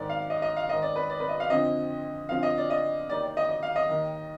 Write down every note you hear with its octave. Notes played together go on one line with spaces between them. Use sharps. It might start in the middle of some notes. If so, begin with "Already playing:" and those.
Already playing: G#2 D#3 D5
F5
D#5
D#5
F5
G#2 D#3 D#5
D5
B4
D5
B4
D#5
F5
F2 D3 F3 D#5
F2 D3 F3 F5
D#5
D5
D#5
D#2 D#3 D5
D5
D#5
D#5
F5
D#5
D#2 D#3